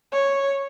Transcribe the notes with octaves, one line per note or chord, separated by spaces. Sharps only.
C#5